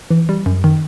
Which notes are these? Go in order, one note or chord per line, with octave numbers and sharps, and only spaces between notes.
E3
G3
F#2
D#3